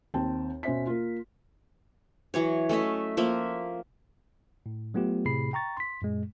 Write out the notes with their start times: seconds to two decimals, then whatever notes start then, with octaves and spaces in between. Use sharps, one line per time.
0.14 D#2 C4 G5 A5
0.63 B2 C#4 C5 E5 B6
0.87 A#3 F4
2.34 E3 F#3 C#5
2.69 A3 C#4 D#5 E5
3.17 F3 A#3 E5
4.66 A2
4.94 F#3 A3 B3 F4 G4
5.26 A2 C3 G#4 B5 C7
5.53 G5 A#5 C#6 A6
5.77 C6 B6
6.02 F#2 A#2 G#3